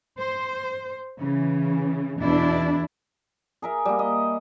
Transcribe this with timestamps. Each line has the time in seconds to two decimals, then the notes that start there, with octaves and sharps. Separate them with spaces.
0.17 C5
1.20 C#3 E3
2.18 E2 B2 D4 E4
3.62 G#4 A#4 E5
3.85 G3 A#3
3.99 D#5